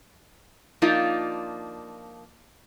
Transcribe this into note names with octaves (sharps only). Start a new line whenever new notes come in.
F3 A#3 D4 D#4 F4